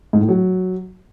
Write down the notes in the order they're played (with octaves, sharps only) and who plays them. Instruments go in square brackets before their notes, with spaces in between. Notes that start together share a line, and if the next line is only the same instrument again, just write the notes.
[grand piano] G#2
A2
F#3